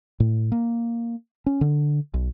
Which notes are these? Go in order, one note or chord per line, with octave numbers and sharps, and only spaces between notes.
A2
A#3
C#4
D3
B1